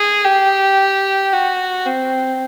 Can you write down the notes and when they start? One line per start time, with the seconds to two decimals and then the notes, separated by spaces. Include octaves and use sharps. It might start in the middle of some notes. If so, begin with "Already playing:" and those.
Already playing: G#4
0.24 G4
1.33 F#4
1.86 C4